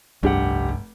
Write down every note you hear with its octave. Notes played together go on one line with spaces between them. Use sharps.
F1 C2 G2 D4 G4 F#5